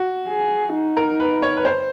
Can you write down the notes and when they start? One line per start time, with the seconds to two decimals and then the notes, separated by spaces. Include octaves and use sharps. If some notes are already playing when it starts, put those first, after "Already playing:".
Already playing: F#4
0.28 G#4
0.74 D#4
0.97 A#4
1.20 B4
1.42 C#5
1.57 B4
1.65 C5